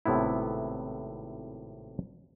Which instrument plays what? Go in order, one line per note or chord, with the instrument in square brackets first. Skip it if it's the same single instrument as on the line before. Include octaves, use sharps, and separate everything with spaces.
[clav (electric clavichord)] G#1 A2 C3 B3 E4